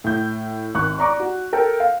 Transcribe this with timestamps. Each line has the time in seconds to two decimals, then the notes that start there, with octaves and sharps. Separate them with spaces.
0.04 A2 G6
0.74 G#1 C#6 F#6
0.98 D5 A#5 C#6 D6
1.20 F#4
1.53 A4 A#4 G5
1.80 F5